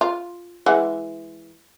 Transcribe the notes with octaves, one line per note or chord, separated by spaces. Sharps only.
F4
E3 G#3 F#5